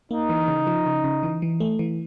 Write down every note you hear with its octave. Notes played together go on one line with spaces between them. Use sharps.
A#3 D#4
E3
C#3
F3
C#3
C#3
E3
E3
A3
E3